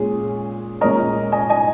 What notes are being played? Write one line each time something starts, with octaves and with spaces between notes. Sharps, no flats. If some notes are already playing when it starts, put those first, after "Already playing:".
Already playing: A#2 G#3 C#4 G#4
A#2 G#3 C#4 A#4 D#5
D#5 G#5
D#5 G#5